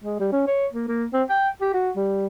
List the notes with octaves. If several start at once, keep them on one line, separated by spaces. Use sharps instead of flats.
G#3
G3
C#4
C#5
A#3
A#3
C4
G5
G4
F#4
G3